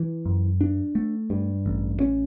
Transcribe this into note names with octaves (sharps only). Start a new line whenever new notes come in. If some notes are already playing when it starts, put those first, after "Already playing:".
Already playing: E3
F#2
D4
A3
G2
A1
C#4